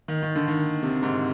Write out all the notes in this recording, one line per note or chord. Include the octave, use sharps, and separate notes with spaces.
D#3
D#3
D3
D#3
C3
G#2